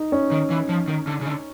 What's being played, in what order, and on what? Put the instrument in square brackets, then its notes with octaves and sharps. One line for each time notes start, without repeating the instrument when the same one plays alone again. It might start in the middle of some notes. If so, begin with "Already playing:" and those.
Already playing: [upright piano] D#4
C#4
[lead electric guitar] D#3
E3
F3
D#3
D3
C#3
D3